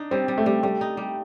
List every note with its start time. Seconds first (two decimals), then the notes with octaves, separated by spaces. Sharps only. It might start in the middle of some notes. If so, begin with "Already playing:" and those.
Already playing: D4 D#4
0.11 G3 C4
0.28 G3
0.38 A3
0.46 G3
0.63 G3 A3
0.81 D#4
0.97 G3